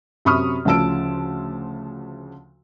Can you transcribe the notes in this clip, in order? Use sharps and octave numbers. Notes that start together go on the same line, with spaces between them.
F#2 C3 B5 C#6 D#6 F6
D2 C#3 F3 A5 E6 D7